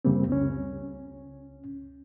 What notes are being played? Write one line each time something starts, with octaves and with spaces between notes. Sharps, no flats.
F#2 C#3 G3 A#3 C4
C#2 C#4